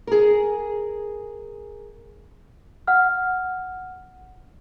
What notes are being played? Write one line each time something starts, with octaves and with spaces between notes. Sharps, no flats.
G#4 A#4
F#5 F6